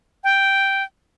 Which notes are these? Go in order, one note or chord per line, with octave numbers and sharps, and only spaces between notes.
G5